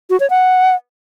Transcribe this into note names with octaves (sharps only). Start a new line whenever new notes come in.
F#4
C#5
F#5